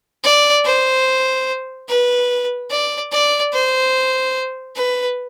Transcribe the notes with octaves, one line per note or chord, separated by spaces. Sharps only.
D5
C5
B4
D5
D5
C5
B4